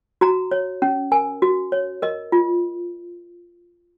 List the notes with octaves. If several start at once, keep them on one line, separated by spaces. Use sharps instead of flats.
F#4 A#5
C#5
C#4
A#4 G#5
F#4
C#5
A#4 D#5
F4